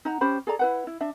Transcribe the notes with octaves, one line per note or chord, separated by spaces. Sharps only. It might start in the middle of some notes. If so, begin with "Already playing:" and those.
D#4 F#5 A#5
C#4 G4 C5 B5
G#4 A4 D5 A#5
E4 B4 F#5
E4
D4 E5